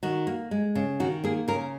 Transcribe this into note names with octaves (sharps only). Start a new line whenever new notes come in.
D#3 F#4
A#3
G#3
C#3
D#3 F#4
A#3 G#4
C#3 A#4